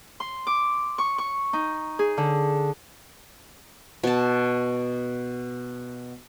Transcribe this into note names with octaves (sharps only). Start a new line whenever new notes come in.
C6
D6
C#6
C#6
D#4
G#4
D3
B2 A5